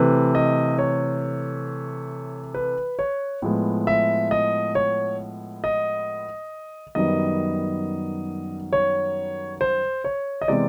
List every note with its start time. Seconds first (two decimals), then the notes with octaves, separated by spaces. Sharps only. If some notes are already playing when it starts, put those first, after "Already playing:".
Already playing: C3 E3 A3 B4
0.35 D#5
0.78 C#5
2.54 B4
2.99 C#5
3.42 A2 F3 G#3 B3
3.87 E5
4.31 D#5
4.75 C#5
5.64 D#5
6.95 F#2 D#3 G3 B3 D#5
8.73 C#5
9.61 C5
10.04 C#5
10.41 D#5
10.48 C3 E3 G#3 B3 D5